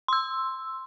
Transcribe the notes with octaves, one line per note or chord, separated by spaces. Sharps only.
C6 E6